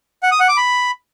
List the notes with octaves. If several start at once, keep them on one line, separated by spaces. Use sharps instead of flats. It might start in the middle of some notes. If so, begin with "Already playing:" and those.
F#5
D#6
F#5
D6
B5